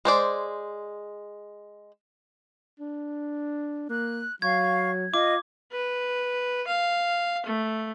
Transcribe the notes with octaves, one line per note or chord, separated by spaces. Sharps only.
G#3 C5 D5
D4
A#3 F#6
F#3 F5 C#6 G#6
F4 D#5 D6
B4
F5
A3